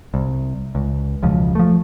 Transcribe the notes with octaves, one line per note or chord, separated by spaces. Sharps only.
C2
C#2
E1 C#2 F3
F3 A3